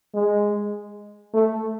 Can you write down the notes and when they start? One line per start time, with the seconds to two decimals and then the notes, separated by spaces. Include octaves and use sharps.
0.15 G#3
1.34 A3